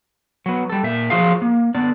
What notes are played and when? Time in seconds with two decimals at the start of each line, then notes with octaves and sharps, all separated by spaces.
0.46 F#3 B3
0.70 G3 A4
0.83 A#2 E5
1.10 F3 F#3 F4 G#4 F5
1.42 A#3
1.75 D3 B3 D5